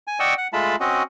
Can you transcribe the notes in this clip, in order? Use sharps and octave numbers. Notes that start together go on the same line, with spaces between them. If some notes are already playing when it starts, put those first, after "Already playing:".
G#5
D5 D#5 F#5 G5 C#6 E6
F#5
G#3 A3 F4 A5 B5
C4 C#4 F#4 D#5